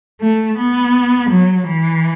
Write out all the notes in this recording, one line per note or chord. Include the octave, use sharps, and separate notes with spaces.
A3
B3
F#3
E3